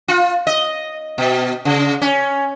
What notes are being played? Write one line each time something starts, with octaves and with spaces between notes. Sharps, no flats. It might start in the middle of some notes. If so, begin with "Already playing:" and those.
F4
D#5
B2
C#3
C#4